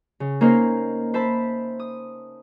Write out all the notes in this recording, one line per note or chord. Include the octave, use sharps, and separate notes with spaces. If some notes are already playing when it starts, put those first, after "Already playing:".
C#3
A#3 C#4 D#4 A#4 C5
C5 E5 A5 B5
D#6